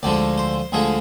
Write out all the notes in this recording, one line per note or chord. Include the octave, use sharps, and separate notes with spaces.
D2 D3 F3 G#3 D5
C5
D2 D3 F3 G#3 G#4